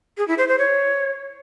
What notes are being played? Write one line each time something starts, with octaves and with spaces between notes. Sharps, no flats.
G#4
E4
C5
C5
C#5